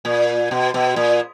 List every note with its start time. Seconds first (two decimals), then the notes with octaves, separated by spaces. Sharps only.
0.05 A#2
0.51 B2
0.74 B2
0.96 A#2